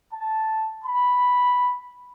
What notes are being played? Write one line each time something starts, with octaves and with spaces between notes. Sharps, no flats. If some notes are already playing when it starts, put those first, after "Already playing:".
A5
B5